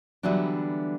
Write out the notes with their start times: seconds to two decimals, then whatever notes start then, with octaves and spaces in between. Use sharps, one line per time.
0.23 D3 E3 F#3 G3 B3 D4